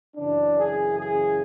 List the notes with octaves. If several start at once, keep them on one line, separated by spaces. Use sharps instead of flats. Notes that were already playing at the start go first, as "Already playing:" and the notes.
F#2 C#3 E3 D4
G#4
G#4